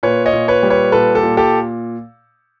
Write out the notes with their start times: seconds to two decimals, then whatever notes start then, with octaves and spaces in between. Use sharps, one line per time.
0.03 A#2 B4 C#5
0.26 C#5 D#5
0.33 A#2
0.48 B4 C#5
0.63 G3
0.70 B4 C#5
0.92 A#2 A4 B4
1.15 G4 A4
1.23 A#2
1.37 G4 A4